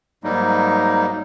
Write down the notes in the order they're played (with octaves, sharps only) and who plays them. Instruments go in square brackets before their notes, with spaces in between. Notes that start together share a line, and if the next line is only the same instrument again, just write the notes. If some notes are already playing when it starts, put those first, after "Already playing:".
[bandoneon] G#2 F#3 G3 A#3 D#4